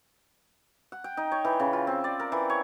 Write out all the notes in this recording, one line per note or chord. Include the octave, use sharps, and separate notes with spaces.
F#5
G5
D#4
C#5
E3
C#3
F4
C4
D5
A#4
E3
C#5